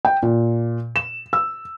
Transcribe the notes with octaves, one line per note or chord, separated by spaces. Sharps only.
G5
A#2
E7
E6